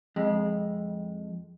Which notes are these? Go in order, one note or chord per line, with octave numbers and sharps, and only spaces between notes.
F2 G#3